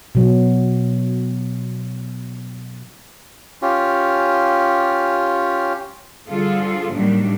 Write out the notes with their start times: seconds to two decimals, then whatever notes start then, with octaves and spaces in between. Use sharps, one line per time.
0.15 B2 F#3
3.62 C#4 F4 G4
6.28 D3 F3 G3 F4 G#4 A4
6.93 A2 D#3 F#3 G3 A#3 D4